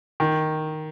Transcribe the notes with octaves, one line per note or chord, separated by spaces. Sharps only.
D#3